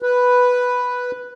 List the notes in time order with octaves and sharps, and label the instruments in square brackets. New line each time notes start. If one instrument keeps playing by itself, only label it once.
[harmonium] B4